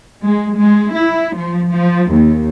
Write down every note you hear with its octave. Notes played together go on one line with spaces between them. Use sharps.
G#3
G#3
E4
F3
F3
D#2